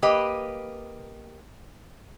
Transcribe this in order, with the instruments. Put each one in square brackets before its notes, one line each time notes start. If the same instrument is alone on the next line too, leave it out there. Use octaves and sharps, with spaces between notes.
[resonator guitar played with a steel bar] A#3 G4 B4 D#5